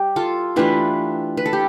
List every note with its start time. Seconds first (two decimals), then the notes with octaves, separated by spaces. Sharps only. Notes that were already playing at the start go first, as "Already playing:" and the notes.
Already playing: G3 G4
0.16 F4 A4
0.56 E3 A3 D4 F4 G4 B4
1.37 B4
1.46 A4
1.53 G4